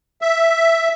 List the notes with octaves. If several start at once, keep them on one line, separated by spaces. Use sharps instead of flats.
E5